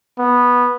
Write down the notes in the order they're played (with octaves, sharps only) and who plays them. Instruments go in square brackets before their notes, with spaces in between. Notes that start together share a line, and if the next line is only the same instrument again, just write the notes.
[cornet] B3